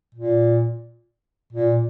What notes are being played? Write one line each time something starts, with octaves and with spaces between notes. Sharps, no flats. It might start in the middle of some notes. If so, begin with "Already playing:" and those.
A#2
A#2